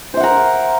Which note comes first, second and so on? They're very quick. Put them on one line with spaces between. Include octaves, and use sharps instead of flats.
C5 E5 F#5 A#4